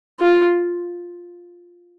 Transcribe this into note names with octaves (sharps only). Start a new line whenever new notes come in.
F4